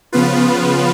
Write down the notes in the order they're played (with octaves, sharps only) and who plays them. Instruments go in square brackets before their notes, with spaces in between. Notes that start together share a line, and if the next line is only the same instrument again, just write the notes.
[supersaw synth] C#3 F3 B3 F4 B4